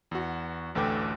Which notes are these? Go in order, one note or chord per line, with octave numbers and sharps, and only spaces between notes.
E2 F#4
A1 D2 A4 B4 G5 D6